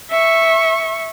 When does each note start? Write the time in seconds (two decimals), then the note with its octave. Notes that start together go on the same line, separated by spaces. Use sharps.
0.10 E5 C#6